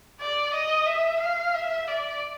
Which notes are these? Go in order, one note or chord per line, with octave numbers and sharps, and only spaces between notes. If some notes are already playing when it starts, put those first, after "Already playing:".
D5
D#5
E5
F5
E5
D5